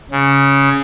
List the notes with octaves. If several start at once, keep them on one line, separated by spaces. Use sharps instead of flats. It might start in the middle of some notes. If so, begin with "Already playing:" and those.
C#3